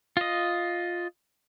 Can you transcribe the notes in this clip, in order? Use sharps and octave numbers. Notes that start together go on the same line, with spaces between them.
F4 D#5